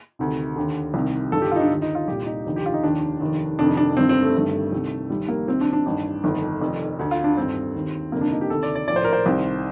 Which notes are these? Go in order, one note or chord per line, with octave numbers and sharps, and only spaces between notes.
D2 C3 D#3
D#2 D3
C2 C3 D#3
G1 G2 D#3 A4
G4
D#4 F4
D4
D#2 D3
D#4
F4
C2 A#2 G4
D#4
F1 D#2 D3
G4
F4
D#4
F1 D#2 D#3 D4
F1 D#2 D#3
F1 F2 C3 D#3 D4
D4
G1 G2 D#3 C4
C4
A3
G1 G2 D#3
C2 C3 D#3
F1 D#2 D#3 G3
A#3
C2 C3 D#3 C4
D4
D4
A1 G2 D#3
G1 F2 D#3
F1 F2 D#3
D2 D3
F4
D4
A1 G2 D#3 C4
D#2 D#3
G1 F2 C3 D#3 A#3
D4
D#4
G4
D2 C3 D#3 A4
D5
D5
A#1 A2 D5
C5
A#4
C5
C2 C3 D#3